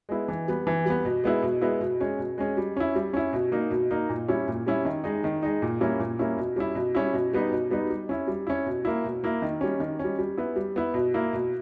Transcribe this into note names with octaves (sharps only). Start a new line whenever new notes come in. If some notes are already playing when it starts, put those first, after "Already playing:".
G#3 B3 E4
E3
G3 B3
E3
G3 B3
B2
G#3 B3 E4
B2
G#3 B3 E4
B2
G#3 C#4
B2
G#3 C#4
G3
C#4 E4
G3
C#4 E4
B2
A#3 D#4
B2
A#3 D#4
A#2
G3 C#4 E4
A#2
G3 C#4 E4
D#3
G#3 D#4
D#3
G#3 D#4
A#2
G3 A#3 C#4 E4
A#2
G3 A#3 C#4 E4
B2
G3 C#4 E4
B2
G3 C#4 E4
B2
G3 B3 D#4
B2
G3 B3 D#4
G3
C#4 E4
G3
C#4 E4
B2
A#3 E4
B2
A#3 E4
D#3
G3 C#4
D#3
G3 C#4
G3
B3 E4
G3
B3 E4
B2
A#3 E4
B2